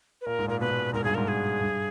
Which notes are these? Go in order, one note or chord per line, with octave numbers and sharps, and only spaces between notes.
B4
A#2 A#4
G#2
A#2 A#4
B2 B4
A#2
G#2 A#4
G2 G#4
G#2 A#4
G#4
G2